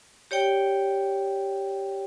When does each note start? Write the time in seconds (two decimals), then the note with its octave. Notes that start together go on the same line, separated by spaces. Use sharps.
0.31 G4 C#5 D5 G5